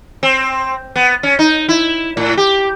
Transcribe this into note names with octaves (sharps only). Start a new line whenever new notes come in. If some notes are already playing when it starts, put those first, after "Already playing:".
C4
B3
C#4
D#4
E4
A2
G4